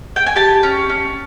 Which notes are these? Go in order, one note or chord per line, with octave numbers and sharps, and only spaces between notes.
G5
G#5
G4 A5
C#4
C#4